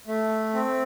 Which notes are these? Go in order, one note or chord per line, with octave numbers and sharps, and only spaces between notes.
A3
C4